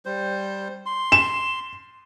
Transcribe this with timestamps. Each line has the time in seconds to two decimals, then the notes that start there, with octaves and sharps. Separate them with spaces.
0.05 G3 C5
0.86 C6
1.12 E7